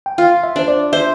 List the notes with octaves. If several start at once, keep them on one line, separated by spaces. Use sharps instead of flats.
G5
F4 F5
E5
D4 C5
D5
C5 E5